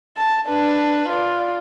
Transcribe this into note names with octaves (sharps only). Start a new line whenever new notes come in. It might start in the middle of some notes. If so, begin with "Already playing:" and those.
A5
D4 B4
F4 D5